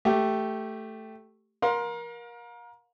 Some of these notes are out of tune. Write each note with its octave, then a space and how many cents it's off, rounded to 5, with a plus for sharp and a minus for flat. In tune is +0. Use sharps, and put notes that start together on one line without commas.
A3 +0 G4 -10
A#4 +25 F5 +40 C6 +0